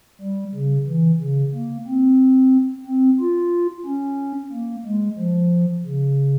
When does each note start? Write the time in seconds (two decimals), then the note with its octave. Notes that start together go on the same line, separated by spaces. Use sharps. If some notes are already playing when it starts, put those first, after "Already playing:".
0.21 G3
0.55 C#3
0.87 E3
1.21 C#3
1.54 A#3
1.87 C4
2.87 C4
3.20 F4
3.86 C#4
4.52 A#3
4.86 G#3
5.19 F3
5.86 C#3